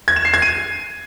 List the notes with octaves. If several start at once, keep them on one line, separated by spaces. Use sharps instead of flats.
G#6
E7
C7
G#6
D#7